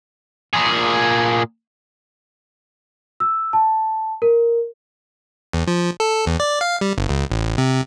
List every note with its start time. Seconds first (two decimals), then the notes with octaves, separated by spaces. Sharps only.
0.53 A#2 G#4
3.20 E6
3.53 A5
4.22 A#4
5.53 E2
5.67 F3
6.00 A4
6.26 E2
6.40 D5
6.61 F5
6.81 G3
6.98 G1
7.09 C#2
7.30 A1
7.58 C3